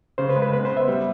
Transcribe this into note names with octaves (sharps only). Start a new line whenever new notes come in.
C#3 C5
B4
G#3
B4
B3 B4
C5
B3
E5
G3